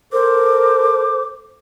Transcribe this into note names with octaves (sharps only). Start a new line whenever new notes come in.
A4 A#4 C5 D6